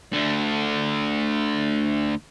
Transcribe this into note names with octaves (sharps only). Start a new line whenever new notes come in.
D2 D3